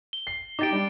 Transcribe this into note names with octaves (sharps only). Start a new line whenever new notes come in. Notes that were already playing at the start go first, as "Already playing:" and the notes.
G7
C7
D#4 G4 D6 A6 D7
G3 D4